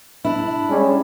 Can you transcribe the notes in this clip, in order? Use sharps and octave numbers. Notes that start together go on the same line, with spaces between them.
D4 E4
G3 G#3 C#4